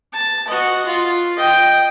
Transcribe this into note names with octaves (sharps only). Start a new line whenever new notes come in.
A5
F#4 D#5
F4
D#5 G5